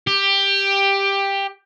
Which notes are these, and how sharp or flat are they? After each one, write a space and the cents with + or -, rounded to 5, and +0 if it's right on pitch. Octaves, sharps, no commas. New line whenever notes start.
G4 +10